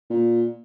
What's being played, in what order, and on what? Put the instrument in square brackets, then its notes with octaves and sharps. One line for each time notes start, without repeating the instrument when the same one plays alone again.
[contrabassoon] A#2